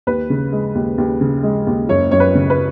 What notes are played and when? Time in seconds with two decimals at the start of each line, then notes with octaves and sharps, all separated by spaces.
0.07 D#2 B4
0.30 C#3
0.52 G#3
0.75 D#2
0.98 D#2
1.21 C#3
1.43 G#3
1.67 D#2
1.89 F#1 C#5
2.11 F#2 C#5
2.20 B4
2.35 C#3
2.50 B4